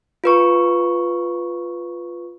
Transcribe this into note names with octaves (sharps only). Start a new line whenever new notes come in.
F4 B4 C#6